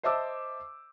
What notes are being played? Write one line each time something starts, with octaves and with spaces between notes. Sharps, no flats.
C5 D#5 E5 A5 D6 E6